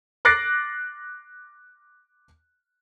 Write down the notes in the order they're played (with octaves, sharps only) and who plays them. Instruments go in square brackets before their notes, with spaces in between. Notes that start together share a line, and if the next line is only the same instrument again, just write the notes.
[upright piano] D6 F#6 A6 A#6 C7 D7